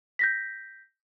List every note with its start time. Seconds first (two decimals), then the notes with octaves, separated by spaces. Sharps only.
0.19 G6 A#6 B6